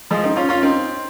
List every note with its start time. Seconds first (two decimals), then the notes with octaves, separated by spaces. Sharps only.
0.11 F3 G#3
0.24 C4 D#4
0.36 C#4 F4
0.49 C#4 F4
0.62 C4 D#4